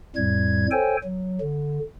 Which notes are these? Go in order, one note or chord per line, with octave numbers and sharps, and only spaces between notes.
F2 A2 G3 G#6
A4 C5 C#5 G5 G#5
F#3
D3